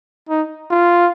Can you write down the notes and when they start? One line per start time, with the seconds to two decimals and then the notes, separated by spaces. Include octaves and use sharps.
0.29 D#4
0.71 F4